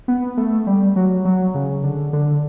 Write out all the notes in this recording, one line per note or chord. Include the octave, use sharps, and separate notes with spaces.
B3
A3
G3
F#3
F#3
C#3
D3
D3